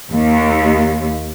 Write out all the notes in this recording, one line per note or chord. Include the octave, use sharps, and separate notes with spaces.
D#2